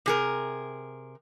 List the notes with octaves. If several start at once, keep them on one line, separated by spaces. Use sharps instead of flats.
C3 G#4 A#4